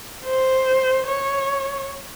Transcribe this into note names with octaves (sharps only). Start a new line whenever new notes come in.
C5
C#5